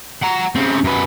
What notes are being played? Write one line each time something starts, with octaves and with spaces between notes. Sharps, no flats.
F#5 A#5
C#3 C4
F#2 B4